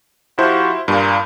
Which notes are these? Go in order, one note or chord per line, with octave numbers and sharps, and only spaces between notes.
F3 E4 F#4 G4 C5
G2 A#2